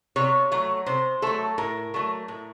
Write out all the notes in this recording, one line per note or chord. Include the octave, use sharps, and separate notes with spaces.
C3 C#5
F#3 A3
C3 C5
F#3 A3 A4
A2 A#4
F#3 A3
A2